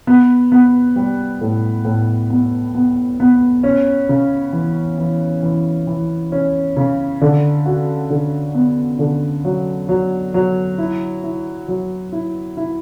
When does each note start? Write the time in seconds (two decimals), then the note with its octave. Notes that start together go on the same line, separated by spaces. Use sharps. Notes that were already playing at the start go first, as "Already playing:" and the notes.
0.07 B3
0.52 B3
0.96 G3
1.41 A2
1.85 A2
2.30 B3
2.75 B3
3.20 B3
3.63 C#4
4.09 C#3
4.53 E3
4.98 E3
5.42 E3
5.87 E3
6.32 C#4
6.77 C#3
7.21 D3
7.66 F#4
8.10 D3
8.54 B3
8.99 D3
9.45 F#3
9.89 F#3
10.34 F#3
10.78 E4
11.23 E4
11.68 F#3
12.12 E4
12.57 E4